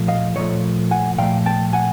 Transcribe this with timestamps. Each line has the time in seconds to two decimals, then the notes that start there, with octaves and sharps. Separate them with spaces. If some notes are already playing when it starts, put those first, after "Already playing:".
Already playing: A#2 F3 A3
0.08 D#5 F5
0.36 A#2 F3 A3 C#5 D#5
0.91 F#5 G#5
1.18 A#2 F3 A3 F5 G5
1.46 G5 A5
1.73 F#5 G#5